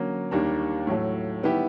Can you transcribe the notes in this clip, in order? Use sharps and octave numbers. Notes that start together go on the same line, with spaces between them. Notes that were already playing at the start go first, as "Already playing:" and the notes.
Already playing: D3 F#3 A#3 C#4
D#2 D#3 G3 A#3 D4
A2 F#3 A3
D#3 G3 B3 E4 G4